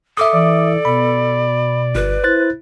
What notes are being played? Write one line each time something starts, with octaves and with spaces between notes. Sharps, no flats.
A4 E5 D6 D#6
E3 D5
B2 B5
G1 B4
E4 C5 F#6 A6